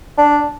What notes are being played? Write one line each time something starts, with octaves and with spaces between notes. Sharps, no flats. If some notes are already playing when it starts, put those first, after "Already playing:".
D4